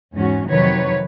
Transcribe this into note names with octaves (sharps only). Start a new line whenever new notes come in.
E2 G#2 C#4 F#4
F2 C3 D#3 F#3 B4 C#5